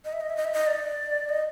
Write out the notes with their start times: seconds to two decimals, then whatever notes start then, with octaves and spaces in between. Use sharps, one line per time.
0.05 D#5
0.13 E5
0.21 D#5
0.29 E5
0.37 D#5
0.45 E5
0.53 D#5
0.67 D5
1.29 D#5